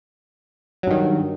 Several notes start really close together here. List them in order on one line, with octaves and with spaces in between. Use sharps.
F#3 G2 D#3